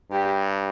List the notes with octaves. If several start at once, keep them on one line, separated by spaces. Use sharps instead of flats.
G2 G4